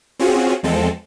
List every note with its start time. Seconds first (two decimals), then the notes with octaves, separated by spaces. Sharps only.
0.19 C4 C#4 F4 F#4 G#4
0.63 E2 F3 G#3 C4 A4